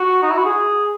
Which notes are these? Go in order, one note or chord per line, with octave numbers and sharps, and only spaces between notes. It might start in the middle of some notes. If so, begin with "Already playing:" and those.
Already playing: F#4
D#4
E4
F#4
G#4